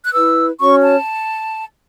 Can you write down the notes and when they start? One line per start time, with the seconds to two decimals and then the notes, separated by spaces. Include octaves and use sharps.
0.06 F#6
0.12 E4 B4 E6
0.59 C#4 F#4 C#5 C#6
0.82 A5